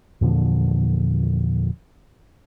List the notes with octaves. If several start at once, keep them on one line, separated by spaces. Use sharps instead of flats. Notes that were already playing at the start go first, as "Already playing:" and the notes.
E2 A#2 D3 F3